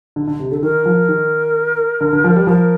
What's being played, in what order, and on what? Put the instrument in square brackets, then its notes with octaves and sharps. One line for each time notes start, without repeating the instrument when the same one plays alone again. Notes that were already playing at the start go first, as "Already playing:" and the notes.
[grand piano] D3
D3
C3
[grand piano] D3 [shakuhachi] A4
[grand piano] D#3 [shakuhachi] A#4
[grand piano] F3
D#3
D3
D3
F3
G3
[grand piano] F3 [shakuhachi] A#4